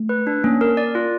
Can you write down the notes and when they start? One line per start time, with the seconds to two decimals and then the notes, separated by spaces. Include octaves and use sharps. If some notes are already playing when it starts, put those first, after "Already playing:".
Already playing: A3
0.09 B4
0.27 D4
0.44 A#3 C#4
0.61 A#4
0.77 D5
0.95 F4